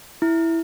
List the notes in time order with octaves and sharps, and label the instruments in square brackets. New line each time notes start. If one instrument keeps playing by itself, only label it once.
[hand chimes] E4